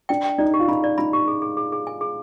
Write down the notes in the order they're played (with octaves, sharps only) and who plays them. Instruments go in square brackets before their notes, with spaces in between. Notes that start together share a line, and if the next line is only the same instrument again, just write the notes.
[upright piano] D4 [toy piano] G5
[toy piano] G5
[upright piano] D#4 [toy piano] D5
[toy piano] G4
[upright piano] F4
[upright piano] D#4 [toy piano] B5
[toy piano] D5
[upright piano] D#4 [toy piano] B5
[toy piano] G4
G#4
G#4
G#4
G#4
G#5
G#4